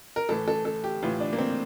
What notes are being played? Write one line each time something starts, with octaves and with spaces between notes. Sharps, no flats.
A#4
A2 E3 A4
A4
A4
G4
A2 E3 F4
D4
A#3
C4